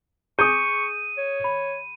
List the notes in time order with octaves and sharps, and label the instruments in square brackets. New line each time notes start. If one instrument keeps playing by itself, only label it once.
[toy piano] G#4 G#5 [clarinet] C#6 [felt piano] D#6 G6 [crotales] D#7
[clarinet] C#5
[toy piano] B5